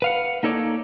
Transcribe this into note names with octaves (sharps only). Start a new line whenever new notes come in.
B4 F5 F#5
A#3 D#4 A4 C#5 D5